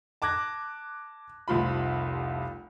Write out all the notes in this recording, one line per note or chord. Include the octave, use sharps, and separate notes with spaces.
A5 D6 F#6 G#6 A#6
F1 C2 F3 F4 B5